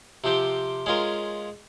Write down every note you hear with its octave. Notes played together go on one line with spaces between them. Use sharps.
C3 F3 C4 G4
G#3 C#4 F4 A#4